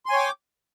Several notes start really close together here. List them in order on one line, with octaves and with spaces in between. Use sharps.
C6 G#5 C#5 G5 D6